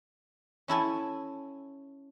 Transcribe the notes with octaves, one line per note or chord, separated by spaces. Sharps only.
C#4 E4 A4 G#5